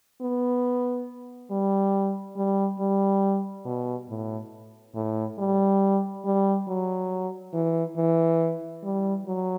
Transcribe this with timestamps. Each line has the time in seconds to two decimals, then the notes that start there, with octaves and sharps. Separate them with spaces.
0.21 B3
1.50 G3
2.36 G3
2.79 G3
3.65 B2
4.09 A2
4.95 A2
5.38 G3
6.25 G3
6.68 F#3
7.53 E3
7.96 E3
8.83 G3
9.27 F#3